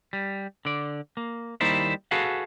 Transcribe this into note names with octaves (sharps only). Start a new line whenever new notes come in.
G3
D3 D5
A#3
D#2 G3 A#3 D#4 E4 C5
F#4 G#4 A4 B4 F5 F#5